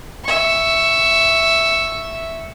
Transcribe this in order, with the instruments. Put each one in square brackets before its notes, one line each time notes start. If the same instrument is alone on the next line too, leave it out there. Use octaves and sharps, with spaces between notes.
[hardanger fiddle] E5 C#6